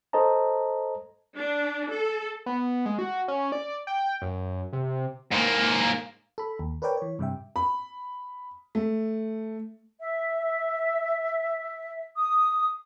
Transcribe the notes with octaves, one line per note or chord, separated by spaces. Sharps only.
A4 C5 D#5 A5 A#5
D4
A4
B3
G#3
F#4
C#4
D5
G5
F#2
C3
G#2 A#3
A4 B5
D#2
A#4 B4 C#5 D5 G5
E3 C#5
G2 C3 G3 E5 G5
B5
A3
E5
D#6